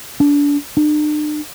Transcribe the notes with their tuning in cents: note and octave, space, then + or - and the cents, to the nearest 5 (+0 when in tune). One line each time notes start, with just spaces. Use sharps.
D4 -30
D4 +45